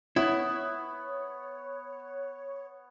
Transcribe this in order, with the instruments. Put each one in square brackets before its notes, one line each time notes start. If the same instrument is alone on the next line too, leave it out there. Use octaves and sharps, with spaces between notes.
[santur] B3 [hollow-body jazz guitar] E4 [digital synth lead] C#5